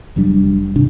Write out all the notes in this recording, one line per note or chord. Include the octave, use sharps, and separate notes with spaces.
F1 F#3 G3 D4
G#1 C3 D4